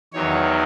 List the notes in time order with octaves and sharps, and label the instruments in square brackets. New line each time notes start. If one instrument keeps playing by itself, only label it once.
[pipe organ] E2 D#3 F#3 C#5